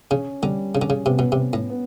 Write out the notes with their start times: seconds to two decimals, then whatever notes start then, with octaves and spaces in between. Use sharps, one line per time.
0.11 C#3 C#4
0.43 D3 G3
0.74 C#3 C#4
0.82 D3
0.90 C#3
1.06 C3 B3
1.19 B2
1.32 C3
1.38 B3
1.53 A2
1.70 B3